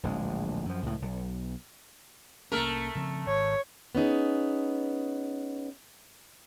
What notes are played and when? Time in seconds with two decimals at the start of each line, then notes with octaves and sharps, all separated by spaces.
0.03 D1 A#1 G#3
0.66 F#2 F3
0.83 C#2 A2
1.02 B1
2.52 C2 A3 A#3 C#4 A#4
2.95 C#3 F3 C4
3.26 G#1 C#5
3.95 B3 C#4 D#4 G#4